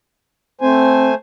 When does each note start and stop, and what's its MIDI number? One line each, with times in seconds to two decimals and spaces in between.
0.61 1.14 57
0.61 1.10 60
0.61 1.14 72
0.61 1.14 80